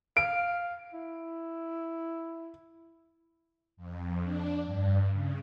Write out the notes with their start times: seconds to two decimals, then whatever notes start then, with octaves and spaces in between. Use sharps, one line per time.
0.17 F5 D7
0.94 E4
3.77 F2
4.22 D4
4.65 G2
5.12 C#3